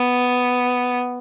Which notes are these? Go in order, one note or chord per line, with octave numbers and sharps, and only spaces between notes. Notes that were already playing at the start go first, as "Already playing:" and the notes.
Already playing: B3